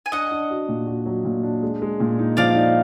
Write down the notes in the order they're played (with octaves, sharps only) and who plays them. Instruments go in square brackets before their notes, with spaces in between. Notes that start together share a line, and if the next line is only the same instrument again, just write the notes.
[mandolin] G#5
[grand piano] D4 [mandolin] D#5 F#5
[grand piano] D4
F#4
A#2
F#4
F#3
A#2
D4
G#3
G#3
A#2
D#4
[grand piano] F3 [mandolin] D5 F5
[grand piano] D#4